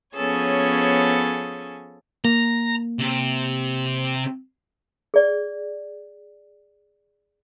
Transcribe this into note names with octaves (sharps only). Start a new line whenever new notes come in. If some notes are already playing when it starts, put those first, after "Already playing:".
F3 B3 C#4 G#4 A4 C#5
A#3 A#5
C3
G#4 D5